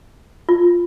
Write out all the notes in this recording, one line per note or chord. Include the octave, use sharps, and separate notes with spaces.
F4